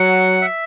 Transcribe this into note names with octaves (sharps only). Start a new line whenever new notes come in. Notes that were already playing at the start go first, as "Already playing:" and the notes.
Already playing: F#3 F#5
E5